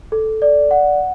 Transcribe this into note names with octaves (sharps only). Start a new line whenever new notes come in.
A4
D5
F#5